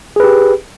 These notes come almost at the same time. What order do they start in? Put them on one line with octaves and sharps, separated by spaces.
G#4 B4 G4